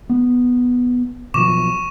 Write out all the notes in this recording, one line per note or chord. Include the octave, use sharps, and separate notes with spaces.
B3
B2 F3 F#3 C#6 D6 E7